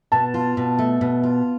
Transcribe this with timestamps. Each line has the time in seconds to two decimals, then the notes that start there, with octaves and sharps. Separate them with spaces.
0.12 B2 A5
0.34 F4
0.57 B2
0.79 A3
1.01 B2
1.23 F4